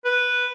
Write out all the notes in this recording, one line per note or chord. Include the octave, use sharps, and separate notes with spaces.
B4